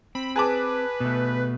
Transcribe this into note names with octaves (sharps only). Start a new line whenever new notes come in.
C4 B5
G#4 B4 A5 D6
B2 A3